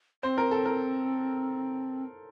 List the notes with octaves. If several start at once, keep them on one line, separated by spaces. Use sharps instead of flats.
C4 C5
A#4
A4
A#4